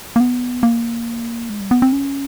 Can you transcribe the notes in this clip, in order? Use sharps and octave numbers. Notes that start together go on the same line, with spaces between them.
A#3
B3
A#3
G#3
G3
B3
C4
C#4